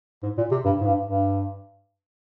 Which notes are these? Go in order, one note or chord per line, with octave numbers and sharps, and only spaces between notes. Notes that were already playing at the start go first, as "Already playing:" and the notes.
G#2
A#2
C3
G2
G#2
G2
G2